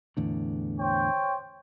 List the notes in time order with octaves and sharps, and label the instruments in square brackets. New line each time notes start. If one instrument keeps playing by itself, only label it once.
[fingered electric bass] E2 A2 D3
[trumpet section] C5 C#5 G5